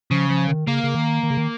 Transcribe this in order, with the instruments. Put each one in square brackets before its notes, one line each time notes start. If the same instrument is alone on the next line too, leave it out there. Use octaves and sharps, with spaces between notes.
[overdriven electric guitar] C#3 [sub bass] F3
[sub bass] F3
D#3
[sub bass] C#3 [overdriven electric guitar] A#3
[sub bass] C#3
D#3
D#3
C#3
D#3